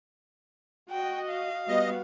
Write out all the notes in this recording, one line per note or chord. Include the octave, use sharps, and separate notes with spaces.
F#4 D#5 G5
F5
G3 B3 F#4 D#5